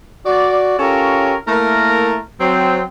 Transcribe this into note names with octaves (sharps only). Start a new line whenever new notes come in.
F#4 D5
C#4 F4 G4 A4 A#4 C#5
A3 A#3 E4 A#4
F#3 C4